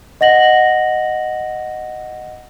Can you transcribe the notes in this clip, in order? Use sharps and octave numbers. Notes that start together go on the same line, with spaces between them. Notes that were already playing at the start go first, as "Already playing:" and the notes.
D#5 F#5 A#6 F#7